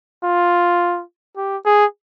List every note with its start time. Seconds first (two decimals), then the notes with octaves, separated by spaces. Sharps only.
0.23 F4
1.37 G4
1.65 G#4